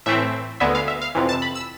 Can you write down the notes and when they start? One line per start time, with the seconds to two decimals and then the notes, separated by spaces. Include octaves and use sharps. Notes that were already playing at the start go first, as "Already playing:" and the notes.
0.06 A2 E3 A3 C4 E5
0.60 D2 D3 G#3 B3 E5
0.75 F5
0.88 E5
1.01 F5
1.15 F2 C3 E3
1.29 A5
1.42 B5
1.55 E6